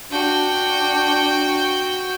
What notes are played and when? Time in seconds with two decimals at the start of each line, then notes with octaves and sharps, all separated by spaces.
0.12 D4 F#4 G5